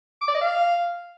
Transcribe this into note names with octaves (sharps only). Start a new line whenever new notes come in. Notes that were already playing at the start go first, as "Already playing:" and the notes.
D6
D5
D#5
F5